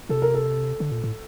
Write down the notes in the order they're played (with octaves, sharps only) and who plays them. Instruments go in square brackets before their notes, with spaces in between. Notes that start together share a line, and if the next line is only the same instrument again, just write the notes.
[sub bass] C3 [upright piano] A4
[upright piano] A#4
A4
[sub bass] D3
A#2
A2